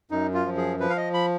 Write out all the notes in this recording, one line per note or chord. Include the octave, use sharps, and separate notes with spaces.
F#2 D#4
F4
F3
G#4
F3 B4
F5
D#5
B5